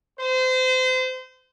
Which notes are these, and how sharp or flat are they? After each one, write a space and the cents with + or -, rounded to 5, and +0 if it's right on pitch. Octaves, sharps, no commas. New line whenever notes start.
C5 -30